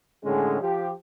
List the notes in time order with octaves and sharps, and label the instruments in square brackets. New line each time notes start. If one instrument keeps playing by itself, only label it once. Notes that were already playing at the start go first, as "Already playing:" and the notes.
[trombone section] A2 D3 G#3 C#4 G#4
F3 G4